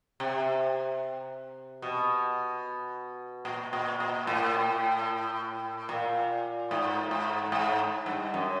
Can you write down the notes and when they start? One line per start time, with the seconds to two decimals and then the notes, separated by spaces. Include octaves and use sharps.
0.20 C3
1.82 B2
3.45 A#2
3.73 A#2
4.00 A#2
4.27 A2
5.89 A#2
6.71 G#2
7.11 G#2
7.52 G#2
8.06 G2
8.34 F#2